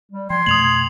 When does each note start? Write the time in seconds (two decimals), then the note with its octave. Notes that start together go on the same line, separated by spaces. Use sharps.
0.12 G3
0.30 F3 G5 C6 G#6
0.46 F2 B2 A3 D#6 F7 F#7